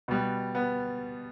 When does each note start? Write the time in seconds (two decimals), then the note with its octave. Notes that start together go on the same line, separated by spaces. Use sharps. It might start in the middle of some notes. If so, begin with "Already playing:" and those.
0.08 B2 G3 B3
0.55 B3